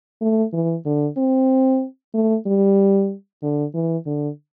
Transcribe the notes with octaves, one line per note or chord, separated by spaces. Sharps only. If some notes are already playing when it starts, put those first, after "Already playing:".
A3
E3
D3
C4
A3
G3
D3
E3
D3